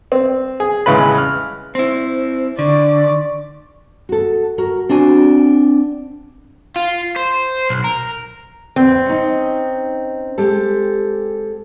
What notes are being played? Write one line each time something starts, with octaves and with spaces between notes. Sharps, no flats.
C4
G#4
A1 C#3 G#3 B4 B5
F6
C4 E4 C5
D3 D5 C#6
F#4 A4
F#4 A#4
C4 D4 F#4 G#5
F4
C5
B1
A#4
E2 C4
C#4 D#4
G#3 G4 A4